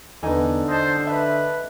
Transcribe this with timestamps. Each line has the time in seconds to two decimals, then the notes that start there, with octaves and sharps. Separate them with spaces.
0.23 E2 D3 B3 D#4 G#5
0.68 C5 D#5 A5
1.07 B4 E5